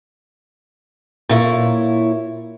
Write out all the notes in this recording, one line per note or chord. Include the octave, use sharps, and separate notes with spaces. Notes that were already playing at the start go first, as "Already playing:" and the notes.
A#2 E4 C#5